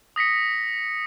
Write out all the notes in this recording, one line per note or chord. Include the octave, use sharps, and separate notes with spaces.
D#6 A#6 B6 C#7